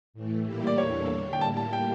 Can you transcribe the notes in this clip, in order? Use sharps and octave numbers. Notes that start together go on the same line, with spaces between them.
A2 E3 A3
A#2 G3 A#3 E4 G4
D5
E2 E3 A#3 D4 A4 C#5
D3 G3 D4
G5
A2 G3 A#3 E4 G4 A5
A5
G5